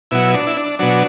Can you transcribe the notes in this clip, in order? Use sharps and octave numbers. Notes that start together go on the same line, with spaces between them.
B2 F#3 E4
D4
E4
D4
B2 F#3 D4